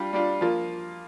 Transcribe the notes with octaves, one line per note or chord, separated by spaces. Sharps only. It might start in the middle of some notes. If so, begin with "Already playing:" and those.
Already playing: G3 D4 F4
G3 D4 F4
F3 A#3 F4